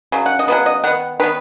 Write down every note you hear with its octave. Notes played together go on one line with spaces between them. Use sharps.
C#3 F#3
F#5
D#5
C#3 F#3 B3 F#5
D#5
D#3 B3 F#5
D#3 B3 B4